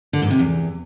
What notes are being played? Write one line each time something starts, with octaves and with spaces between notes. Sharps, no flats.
D3
G#2
C3
E2